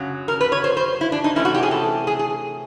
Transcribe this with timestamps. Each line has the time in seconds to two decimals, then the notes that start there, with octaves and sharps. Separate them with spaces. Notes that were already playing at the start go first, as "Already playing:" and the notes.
Already playing: F#2 C#3 F#3
0.28 A#4
0.41 B4
0.52 C#5
0.64 C5
0.77 C5
1.01 E4
1.12 D4
1.24 D#4
1.36 C3 E3 A3 C#4 E4
1.45 F#4
1.55 G4
1.63 G#4
1.71 A4
2.07 G#4
2.19 G#4